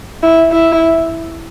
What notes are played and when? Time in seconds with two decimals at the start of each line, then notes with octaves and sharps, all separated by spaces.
0.23 E4
0.51 E4